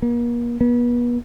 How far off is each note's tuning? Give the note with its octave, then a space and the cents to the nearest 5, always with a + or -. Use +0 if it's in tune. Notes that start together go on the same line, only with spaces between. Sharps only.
A#3 +40
B3 -35